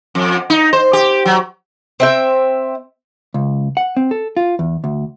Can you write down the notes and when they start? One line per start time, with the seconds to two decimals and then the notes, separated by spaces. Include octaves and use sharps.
0.15 F2
0.50 D#4
0.73 C5
0.93 G4
1.26 F#3
2.00 C4 E5 G5
3.34 C#2
3.77 F#5
3.97 C4
4.11 A4
4.37 F4
4.59 E2
4.84 D2